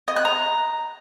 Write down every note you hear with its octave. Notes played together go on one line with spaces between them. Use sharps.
D#5
F#6
A#5